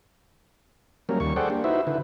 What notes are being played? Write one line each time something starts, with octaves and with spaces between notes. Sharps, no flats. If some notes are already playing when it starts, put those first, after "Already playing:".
F#3 G3 A#3 C#4 A#4
D#2 G3 A#3 C#6
G#4 A4 C5 D5 F#5 G5
A#3 D4 G4
D#4 E4 F#4 B4 C5 E5
D3 E4 B4